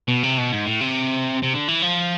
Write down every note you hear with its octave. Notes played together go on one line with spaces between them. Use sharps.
B2
C3
B2
G#2
A2
C3
C3
D3
E3
F3